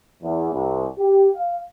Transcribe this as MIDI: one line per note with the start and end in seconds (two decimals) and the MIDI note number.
0.23 0.52 40
0.53 0.86 36
0.99 1.28 67
1.35 1.58 77